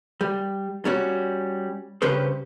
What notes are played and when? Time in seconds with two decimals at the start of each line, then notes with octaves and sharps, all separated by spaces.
0.21 G3
0.85 G3 C#4 F#4
2.02 G2 C#3 C#4 G4 B4 C5